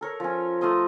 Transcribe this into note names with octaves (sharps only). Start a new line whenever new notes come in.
A4 A#4 C#5
F3 C#4
A3 F4 D#5 C6